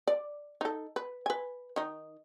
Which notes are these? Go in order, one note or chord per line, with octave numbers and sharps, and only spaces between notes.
D5
D#4 A4
B4
B4 G#5
D#3 D#4